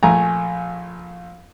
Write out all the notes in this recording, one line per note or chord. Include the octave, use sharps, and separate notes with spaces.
A#1 A3 G#5 A#5